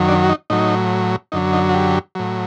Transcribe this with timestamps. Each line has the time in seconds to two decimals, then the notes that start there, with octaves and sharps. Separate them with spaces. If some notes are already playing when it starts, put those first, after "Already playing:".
Already playing: F#2 D#3 F#3
0.08 D4
0.23 F#4
0.29 D#4
0.50 A2 F#3 D#4
1.32 F#2 D3 F#3 D#4
1.53 D#4
1.69 F#4
1.74 G4
2.15 A2 F#3